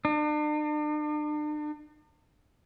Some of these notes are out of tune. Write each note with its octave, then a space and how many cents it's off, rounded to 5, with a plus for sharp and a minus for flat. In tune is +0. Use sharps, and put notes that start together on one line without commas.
D4 +40